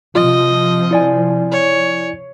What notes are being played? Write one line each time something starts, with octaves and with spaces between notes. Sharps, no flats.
C3 F3 F4 D#5
E4 D5 G#5
C#5